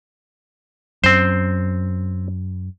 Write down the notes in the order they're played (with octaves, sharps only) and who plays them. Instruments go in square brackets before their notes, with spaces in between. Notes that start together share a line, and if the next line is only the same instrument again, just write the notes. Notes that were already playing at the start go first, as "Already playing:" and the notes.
[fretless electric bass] F#2 [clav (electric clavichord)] C4 C5